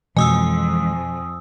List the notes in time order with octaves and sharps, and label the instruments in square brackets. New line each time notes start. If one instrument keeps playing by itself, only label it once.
[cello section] F2 [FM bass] B2 [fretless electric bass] E3 G#3 C4 [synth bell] G#5 D#6 E6